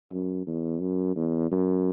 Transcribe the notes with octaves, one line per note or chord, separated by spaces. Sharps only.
F#2
E2
F#2
E2
F#2